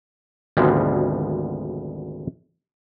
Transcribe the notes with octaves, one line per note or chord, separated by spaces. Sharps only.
G#1 D2 B2 F3 G3 G#3